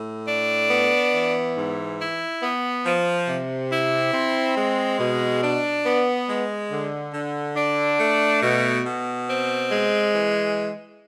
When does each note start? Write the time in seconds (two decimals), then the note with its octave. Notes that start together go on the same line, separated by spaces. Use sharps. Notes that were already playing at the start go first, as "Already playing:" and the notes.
Already playing: A2
0.28 D4
0.70 B3
1.13 E3
1.56 G#2
1.99 E4
2.42 B3
2.85 F3
3.28 C3
3.71 E4
4.13 C4
4.56 G#3
4.99 B2
5.42 D4
5.84 B3
6.28 G#3
6.71 D3
7.14 D3
7.56 D4
7.99 A3
8.42 B2
8.85 B2
9.28 C4
9.71 G#3
10.14 E3